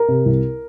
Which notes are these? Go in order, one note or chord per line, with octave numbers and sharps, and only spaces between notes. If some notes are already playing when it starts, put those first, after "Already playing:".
Already playing: A#4
C3
C2